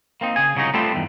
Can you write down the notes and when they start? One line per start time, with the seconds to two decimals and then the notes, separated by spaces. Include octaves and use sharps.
0.21 A#3 C4 D#4
0.36 C#3 G#4 G#5
0.56 C2 C#3 F#3 C#4 D#4
0.74 G3 A3 B3 C4 F4 A4
0.94 E2 G2 D#3